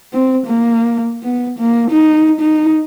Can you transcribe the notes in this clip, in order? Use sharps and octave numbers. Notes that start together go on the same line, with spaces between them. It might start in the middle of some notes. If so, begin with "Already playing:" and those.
C4
A#3
B3
A#3
D#4
D#4